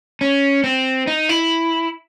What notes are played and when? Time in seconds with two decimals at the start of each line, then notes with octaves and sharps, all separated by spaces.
0.21 C#4
0.64 C4
1.07 D#4
1.29 E4